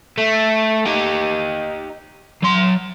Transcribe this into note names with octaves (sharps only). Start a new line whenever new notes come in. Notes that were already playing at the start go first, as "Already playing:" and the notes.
A3
D#4 G4
F#3 C6